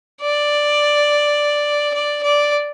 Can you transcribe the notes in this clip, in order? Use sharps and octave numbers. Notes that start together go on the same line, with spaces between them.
D5
D5
D5